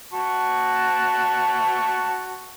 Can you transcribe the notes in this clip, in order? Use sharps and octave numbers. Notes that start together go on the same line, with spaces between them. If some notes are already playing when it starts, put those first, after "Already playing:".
F#4 A5 C#6